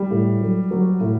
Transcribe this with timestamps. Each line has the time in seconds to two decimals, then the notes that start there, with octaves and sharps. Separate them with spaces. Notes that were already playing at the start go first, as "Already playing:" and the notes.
Already playing: G3
0.11 A2
0.41 F#3
0.71 F#3
1.00 A2